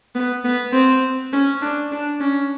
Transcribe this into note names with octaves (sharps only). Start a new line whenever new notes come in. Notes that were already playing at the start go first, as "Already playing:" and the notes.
B3
B3
C4
C#4
D4
D4
C#4